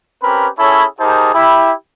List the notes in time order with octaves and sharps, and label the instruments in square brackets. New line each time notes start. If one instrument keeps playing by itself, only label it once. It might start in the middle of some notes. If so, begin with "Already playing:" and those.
[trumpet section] C4 C#4 G4 A#4 B4 B5
C#4 E4 G#4 A4 C#5 B5
D#4 G4 G#4 A#4 C5 A5
E4 G4 B5